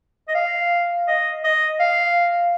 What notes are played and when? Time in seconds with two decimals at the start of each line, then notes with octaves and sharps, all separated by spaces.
0.28 D#5
0.35 F5
1.08 D#5
1.44 D#5
1.80 F5